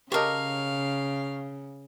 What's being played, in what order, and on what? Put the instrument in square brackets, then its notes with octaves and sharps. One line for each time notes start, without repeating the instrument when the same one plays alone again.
[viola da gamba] C#3 [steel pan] G4 A4 D#5 [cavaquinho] A#4 C#5 [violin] F5